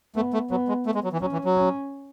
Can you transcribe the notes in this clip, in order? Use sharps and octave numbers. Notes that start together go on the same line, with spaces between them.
A3 B3
A3
F#3 B3
G#3
A3
G#3
F#3
E3
F#3 C#4
E3
F#3
C#4